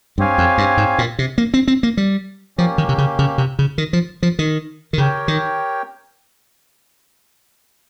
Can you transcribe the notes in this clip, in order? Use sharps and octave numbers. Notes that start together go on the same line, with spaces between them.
G2 C4 G4 C#5 F5 G#5
F2
G2
G#2
A#2
C3
A#3
C4
C4
A#3
G3
F3 A#3 C#4 G4
D#3
C3
C#3
C#3
C3
C#3
D#3
F3
F3
D#3
D#3
C#3 G4 A#4 C#5 G5
D#3